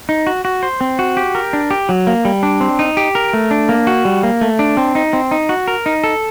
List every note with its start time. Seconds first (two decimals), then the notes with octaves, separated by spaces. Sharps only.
0.09 D#4
0.27 F#4
0.45 F#4
0.63 C5
0.81 C4
0.99 F#4
1.17 G4
1.35 A#4
1.53 D4
1.71 G4
1.89 F#3
2.07 A#3
2.25 G3
2.43 D4
2.61 C4
2.79 D#4
2.97 G4
3.15 A#4
3.33 A3
3.51 D4
3.69 A#3
3.87 F#4
4.05 G3
4.23 A#3
4.41 A3
4.59 D4
4.77 C4
4.95 D#4
5.13 C4
5.31 D#4
5.49 F#4
5.68 A#4
5.86 D#4
6.04 A4